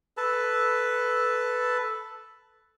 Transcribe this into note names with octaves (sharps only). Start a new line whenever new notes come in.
A4 B4 A5